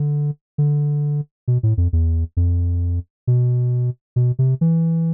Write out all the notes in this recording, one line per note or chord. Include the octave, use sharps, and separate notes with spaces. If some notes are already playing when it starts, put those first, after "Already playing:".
Already playing: D3
D3
B2
A2
F2
E2
F2
B2
B2
C3
E3